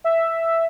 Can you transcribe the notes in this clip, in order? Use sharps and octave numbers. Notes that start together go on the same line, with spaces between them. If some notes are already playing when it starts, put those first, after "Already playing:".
E5